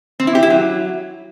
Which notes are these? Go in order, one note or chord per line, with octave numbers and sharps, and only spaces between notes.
C4
E4
G4
E4
F#3